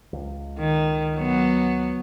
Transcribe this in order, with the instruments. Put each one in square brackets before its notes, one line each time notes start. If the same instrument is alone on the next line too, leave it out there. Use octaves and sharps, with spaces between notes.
[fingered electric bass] C#2
[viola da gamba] D#3
F#3 B3